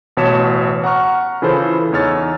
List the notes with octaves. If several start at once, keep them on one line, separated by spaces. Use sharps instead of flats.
A1 B2 C#5 A5 B6 E7
F#5 A#5 C#6 F6
C#3 E3 E4 F4 A4 C5
E2 D#4 C#5 E6 F6 A6